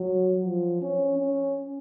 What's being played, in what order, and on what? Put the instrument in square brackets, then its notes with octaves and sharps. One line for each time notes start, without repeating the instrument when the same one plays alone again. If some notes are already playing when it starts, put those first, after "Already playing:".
Already playing: [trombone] F#3
F3
C#4
C#4